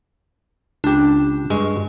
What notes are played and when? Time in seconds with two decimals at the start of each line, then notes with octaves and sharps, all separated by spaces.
0.84 C#2 D4 G4
1.50 G2 G#3 C#6